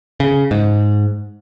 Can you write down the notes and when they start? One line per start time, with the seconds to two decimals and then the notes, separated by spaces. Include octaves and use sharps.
0.20 C#3
0.51 G#2